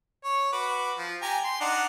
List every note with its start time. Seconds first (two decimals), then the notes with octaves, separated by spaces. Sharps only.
0.24 C#5
0.53 F#4 B4 D6
0.98 F3
1.22 G4 G#5 A#5
1.45 C6
1.61 D4 D#4 F#5